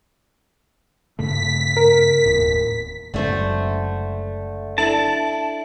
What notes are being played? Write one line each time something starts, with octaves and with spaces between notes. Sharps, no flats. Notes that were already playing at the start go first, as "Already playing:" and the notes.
G2 C#3 A3 B6
A#4
E1 D#2 A2
F#1 F#2 D3 G#3 A3 C5
D4 E4 A4 A5